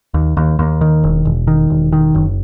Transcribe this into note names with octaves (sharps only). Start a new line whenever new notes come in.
D#2
D#2
D#2
D#3
E1
E1
D#3
E1
D#3
F#1